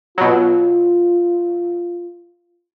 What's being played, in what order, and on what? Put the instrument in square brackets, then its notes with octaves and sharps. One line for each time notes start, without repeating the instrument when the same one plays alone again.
[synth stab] B2 F#3 [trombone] F4